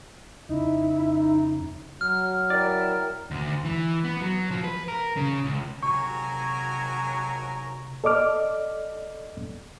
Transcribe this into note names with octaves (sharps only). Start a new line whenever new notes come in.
F2 C#3 D#4 E4
F#3 F6
E4 A#4 D5 G5
D2
E3
B3
F#3
F3
B4
A#4
C#3
C#2
G#1 C3 F#3 A#4 G#5 C#6
A4 D5 D#5 D6 F6